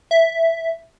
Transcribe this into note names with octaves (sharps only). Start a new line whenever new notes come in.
E5